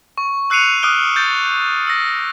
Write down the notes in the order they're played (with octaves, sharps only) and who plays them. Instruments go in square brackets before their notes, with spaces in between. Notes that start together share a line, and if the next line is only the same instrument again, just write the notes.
[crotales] C#6
E6 F#6 C7 C#7 D#7 F7
D6 D#6 F6 F#6 D7 G7
G6 A6
E6 A#6